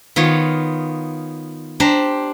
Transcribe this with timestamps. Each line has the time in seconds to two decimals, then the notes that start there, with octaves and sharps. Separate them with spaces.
0.16 D#3 B3 F4 C#5
1.80 D4 G4 C5 A#5